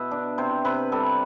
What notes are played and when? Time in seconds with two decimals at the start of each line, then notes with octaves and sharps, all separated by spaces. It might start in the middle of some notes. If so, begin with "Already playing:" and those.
Already playing: B2 E5
0.11 D4
0.38 C3 C5
0.65 C3 B4
0.92 G3 A4